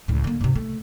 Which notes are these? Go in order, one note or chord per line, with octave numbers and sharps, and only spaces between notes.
C#2 A2
D3 A#3
G#2 C3
A3